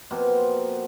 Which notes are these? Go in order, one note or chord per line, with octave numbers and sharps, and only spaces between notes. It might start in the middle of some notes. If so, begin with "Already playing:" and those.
B2 F3 A#3 C4